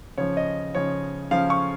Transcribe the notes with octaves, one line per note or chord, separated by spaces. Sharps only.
C#3 F3 C#5
D#5
C#3 F3 C#5
C#3 F3 F5
C#6